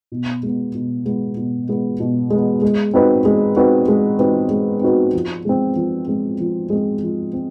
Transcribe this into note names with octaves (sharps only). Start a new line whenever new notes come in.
B2
G#3 B3
B2
G#3 B3
B2
G#3 B3
B2
G#3 B3
G#3
C4 D#4 F#4 B4
G#3
C4 D#4 F#4 B4
G#3
C4 D#4 F#4 B4
G#3
C4 D#4 F#4 B4
F3
G#3 C4
F3
G#3 C4
F3
G#3 C4
F3
C4